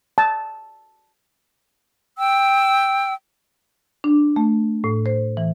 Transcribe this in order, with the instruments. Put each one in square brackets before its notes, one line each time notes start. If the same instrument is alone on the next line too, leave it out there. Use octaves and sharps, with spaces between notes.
[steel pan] A5
[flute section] G5 E6
[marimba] D4
A3
A2
C5
E3